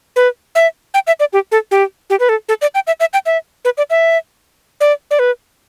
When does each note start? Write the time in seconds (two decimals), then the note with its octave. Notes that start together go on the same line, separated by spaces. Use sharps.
0.16 B4
0.55 E5
0.94 G5
1.07 E5
1.20 D5
1.33 G4
1.52 A4
1.71 G4
2.10 G4
2.20 B4
2.29 A4
2.49 A4
2.62 D5
2.75 G5
2.87 E5
3.00 E5
3.13 G5
3.26 E5
3.65 B4
3.78 D5
3.90 E5
4.81 D5
5.11 D5
5.19 B4